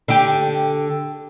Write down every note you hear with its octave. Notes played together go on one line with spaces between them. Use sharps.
D3 G4